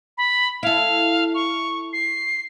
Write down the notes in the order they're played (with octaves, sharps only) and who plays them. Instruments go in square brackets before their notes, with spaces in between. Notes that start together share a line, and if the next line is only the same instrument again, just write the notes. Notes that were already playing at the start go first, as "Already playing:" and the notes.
[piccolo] B5
[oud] E4 A4 [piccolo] F5
[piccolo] C#6
C7